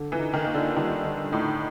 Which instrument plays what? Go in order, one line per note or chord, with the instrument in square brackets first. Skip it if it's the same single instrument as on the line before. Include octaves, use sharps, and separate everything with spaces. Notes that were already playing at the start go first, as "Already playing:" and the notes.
Already playing: [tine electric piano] D3
[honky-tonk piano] E3
[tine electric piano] D#4
[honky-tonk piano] D#3
[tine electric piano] A#3
[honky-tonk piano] D3
[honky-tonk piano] D#3 [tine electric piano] G3
[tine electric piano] D3
[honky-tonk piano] A2 [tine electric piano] D#4